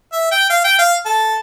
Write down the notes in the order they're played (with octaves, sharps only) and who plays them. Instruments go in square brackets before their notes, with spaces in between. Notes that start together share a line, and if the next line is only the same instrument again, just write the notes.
[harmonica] E5
G5
F5
G5
F5
A4